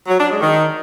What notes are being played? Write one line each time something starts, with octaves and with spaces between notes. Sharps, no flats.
F#3
D4
G#3
D#3